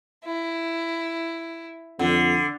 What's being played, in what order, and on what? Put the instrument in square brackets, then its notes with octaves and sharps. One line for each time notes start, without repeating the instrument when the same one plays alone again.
[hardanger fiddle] E4
[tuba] F2 [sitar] D3